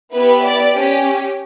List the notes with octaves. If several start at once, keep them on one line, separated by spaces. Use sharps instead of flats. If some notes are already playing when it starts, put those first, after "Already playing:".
B3 E4 G4 B4
D5
C#4 G4